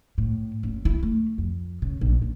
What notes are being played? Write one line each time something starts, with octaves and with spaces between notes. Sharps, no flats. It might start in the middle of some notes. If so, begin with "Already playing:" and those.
A2
F#1
E4
A3
F2
C#3
A#1
F#1